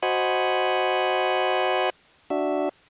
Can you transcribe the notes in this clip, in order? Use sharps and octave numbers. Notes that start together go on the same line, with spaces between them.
F#4 C5 D#5 F#5 G#5 B5
D4 F#4 E5